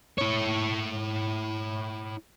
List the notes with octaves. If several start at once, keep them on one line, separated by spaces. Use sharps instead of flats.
E4 C#5